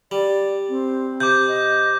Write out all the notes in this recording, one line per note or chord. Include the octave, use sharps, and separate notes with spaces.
G3 D5
C4
C3 D6 G6
D#5